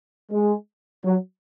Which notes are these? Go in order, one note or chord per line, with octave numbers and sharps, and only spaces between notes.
G#3
F#3